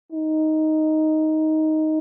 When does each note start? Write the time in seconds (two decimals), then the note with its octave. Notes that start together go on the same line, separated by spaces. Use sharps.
0.12 D#4